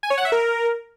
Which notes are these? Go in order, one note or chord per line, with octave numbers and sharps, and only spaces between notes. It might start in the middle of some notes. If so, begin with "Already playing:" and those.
G#5
C#5
F#5
E5
A#4